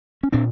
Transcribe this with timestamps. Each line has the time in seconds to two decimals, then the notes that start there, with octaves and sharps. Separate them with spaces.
0.23 C#4
0.32 A#2 C4 D4